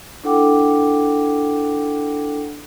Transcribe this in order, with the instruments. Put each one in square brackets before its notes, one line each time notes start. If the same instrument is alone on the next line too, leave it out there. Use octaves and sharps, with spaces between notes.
[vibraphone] D4 E4 A4 F#5 G5 D6